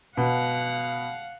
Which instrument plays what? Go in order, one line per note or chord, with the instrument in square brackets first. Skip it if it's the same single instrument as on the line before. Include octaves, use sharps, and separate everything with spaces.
[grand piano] B2 [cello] F5 F#5